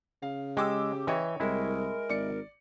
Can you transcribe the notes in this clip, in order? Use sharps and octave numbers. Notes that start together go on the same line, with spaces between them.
C#3 F5
G#3 G4 G5 D6 E6
E3 C#5 D#5 G5
C2 G#3 E4 A#4
G#1 D5 C#7